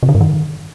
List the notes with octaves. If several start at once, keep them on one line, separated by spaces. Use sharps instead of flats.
C3
D3
G2
D#3